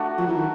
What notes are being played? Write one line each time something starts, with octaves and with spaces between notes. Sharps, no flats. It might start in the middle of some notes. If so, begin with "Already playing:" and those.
Already playing: A3 D4 F#4
F3 F#3
E3
D#3